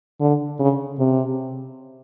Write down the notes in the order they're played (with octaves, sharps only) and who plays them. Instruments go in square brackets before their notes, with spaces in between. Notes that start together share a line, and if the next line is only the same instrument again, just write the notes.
[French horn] D3
C#3
C3